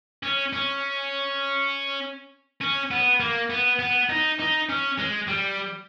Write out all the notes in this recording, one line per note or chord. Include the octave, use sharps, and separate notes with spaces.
C#4
C#4
C#4
B3
A#3
B3
B3
D#4
D#4
C#4
G#3
G3